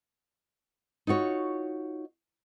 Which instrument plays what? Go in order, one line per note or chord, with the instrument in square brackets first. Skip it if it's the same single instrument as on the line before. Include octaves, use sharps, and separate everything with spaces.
[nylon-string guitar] D#4 F4 F#4 C#5